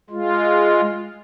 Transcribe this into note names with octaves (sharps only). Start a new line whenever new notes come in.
G#3 F4